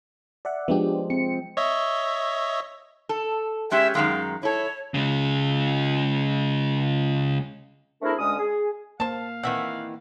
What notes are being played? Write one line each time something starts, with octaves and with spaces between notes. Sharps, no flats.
D5 E5 F#5
F3 G#3 B3 D4 G4
C4 C#7
C#5 D#5 E5
A4
G#3 C#4 G4 E5
F#2 D#3 G#3 F5
E4 A4 C#5
C#3 G#3
A3 C4 D4 E4 G#4 A#4
D2 D3 G#3 C#4 D#6
G#4
A#3 C5 F5 A5
D#3 E3 C4 E5 F#5